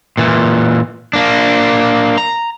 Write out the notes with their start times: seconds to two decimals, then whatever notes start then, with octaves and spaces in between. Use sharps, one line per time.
0.18 A#2 E3
1.13 A#3 D4
2.18 A#5